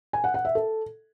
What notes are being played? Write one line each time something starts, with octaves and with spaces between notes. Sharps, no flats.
G#5
F#5
F#5
E5
A4